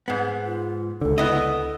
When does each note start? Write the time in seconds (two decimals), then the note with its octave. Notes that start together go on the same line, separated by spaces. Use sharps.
0.08 G#2 B3
0.46 F4
1.01 C#2 D3 A4
1.18 B3 E4 D#5